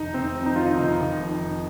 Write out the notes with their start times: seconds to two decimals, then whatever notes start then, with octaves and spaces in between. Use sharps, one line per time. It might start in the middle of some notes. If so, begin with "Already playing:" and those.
Already playing: F1 F2 D#3 D#4
0.14 F1 C4
0.35 F2
0.46 D#4
0.56 D#3 F4
0.66 D#4
0.78 F1 D#4
0.99 F1
1.20 F2
1.42 D#3